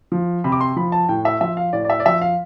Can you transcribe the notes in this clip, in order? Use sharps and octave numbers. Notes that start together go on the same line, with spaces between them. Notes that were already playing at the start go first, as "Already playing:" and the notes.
F3
C3 B5
D6
C6
F3 B5
A5
A2 G5
E5
F3 E5
F5
A2 D5
D5
E5
D5
F3 E5
F5